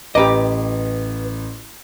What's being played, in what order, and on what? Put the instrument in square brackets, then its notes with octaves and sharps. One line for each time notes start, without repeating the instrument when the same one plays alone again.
[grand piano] A1 [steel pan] G4 A#5 D6 [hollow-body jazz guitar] B4 D#5